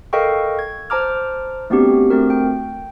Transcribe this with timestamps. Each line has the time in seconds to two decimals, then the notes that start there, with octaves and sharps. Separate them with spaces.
0.13 A4 A#4 D#5 F5 G5 C#6
0.59 G#6
0.90 C5 A5 A#5 D6 F6
1.70 A3 B3 C4 D4 F#4 G4
2.10 A3 C4 F#4 A#4
2.30 G5